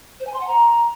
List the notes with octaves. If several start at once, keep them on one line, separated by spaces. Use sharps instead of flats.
C5
G#5
C6
F#5
A#5